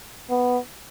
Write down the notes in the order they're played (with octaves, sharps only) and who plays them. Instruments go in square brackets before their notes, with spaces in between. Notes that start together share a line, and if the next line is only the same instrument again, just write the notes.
[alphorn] B3